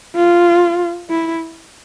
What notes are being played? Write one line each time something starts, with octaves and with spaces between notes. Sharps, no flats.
F4
E4